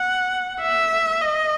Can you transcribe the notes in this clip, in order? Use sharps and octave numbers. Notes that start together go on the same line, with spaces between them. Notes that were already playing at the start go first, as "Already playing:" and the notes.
Already playing: F#5
E5
D#5